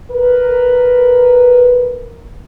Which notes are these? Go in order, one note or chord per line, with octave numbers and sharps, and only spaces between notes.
A#4 B4